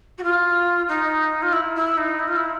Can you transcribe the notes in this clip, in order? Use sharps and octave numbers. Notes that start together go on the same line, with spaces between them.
F#4
F4
D#4
F4
E4
E4
D#4
E4
F4
E4